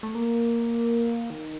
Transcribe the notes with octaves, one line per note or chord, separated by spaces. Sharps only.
A3
A#3
D#3